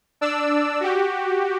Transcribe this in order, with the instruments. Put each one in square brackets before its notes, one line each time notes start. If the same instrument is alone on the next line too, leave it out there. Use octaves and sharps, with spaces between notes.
[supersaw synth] D4 D5 E6
F#4 G4